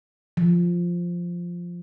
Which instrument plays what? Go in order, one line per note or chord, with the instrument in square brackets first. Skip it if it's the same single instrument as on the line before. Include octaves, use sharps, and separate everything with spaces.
[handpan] F3